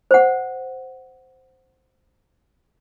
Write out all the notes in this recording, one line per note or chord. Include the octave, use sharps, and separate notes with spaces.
C5 F#5